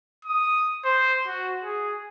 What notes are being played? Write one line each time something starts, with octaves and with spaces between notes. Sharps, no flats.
D#6
C5
F#4
G#4